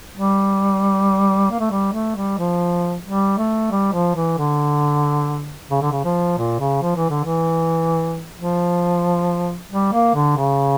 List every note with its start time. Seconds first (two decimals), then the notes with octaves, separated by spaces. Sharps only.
0.16 G3
1.51 A#3
1.60 A3
1.71 G3
1.93 A3
2.16 G3
2.38 F3
3.05 G3
3.38 A3
3.72 G3
3.93 F3
4.16 E3
4.38 D3
5.71 C#3
5.82 D3
5.92 C#3
6.05 F3
6.37 A#2
6.60 C#3
6.82 F3
6.96 E3
7.10 D3
7.24 E3
8.37 F3
9.71 G3
9.93 A#3
10.15 D3
10.37 C#3